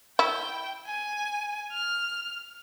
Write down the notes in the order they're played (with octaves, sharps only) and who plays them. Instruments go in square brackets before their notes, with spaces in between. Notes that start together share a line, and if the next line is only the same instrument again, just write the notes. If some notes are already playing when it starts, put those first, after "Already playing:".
[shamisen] E4 [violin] G5
[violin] G#5
F6